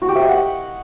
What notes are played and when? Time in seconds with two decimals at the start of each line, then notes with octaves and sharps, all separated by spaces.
0.02 F#4
0.08 G4
0.15 E5
0.22 D#5
0.29 F#5